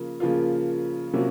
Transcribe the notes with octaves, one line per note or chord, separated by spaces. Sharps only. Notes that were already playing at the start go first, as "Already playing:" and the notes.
Already playing: C#3 F3 A#3
C#3 F3 A#3 F4
C3 F#3 A#3 C#4 F4